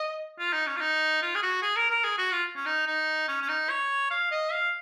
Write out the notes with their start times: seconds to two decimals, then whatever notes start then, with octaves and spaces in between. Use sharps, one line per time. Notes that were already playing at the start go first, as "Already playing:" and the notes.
Already playing: D#5
0.39 F4
0.53 D#4
0.67 C#4
0.76 F4
0.81 D#4
1.22 F4
1.35 G#4
1.43 F#4
1.62 G#4
1.76 A#4
1.90 A#4
2.04 G#4
2.18 F#4
2.31 F4
2.56 C#4
2.66 D#4
2.87 D#4
3.28 C#4
3.41 C#4
3.48 D#4
3.69 C#5
4.11 F5
4.31 D#5
4.52 F5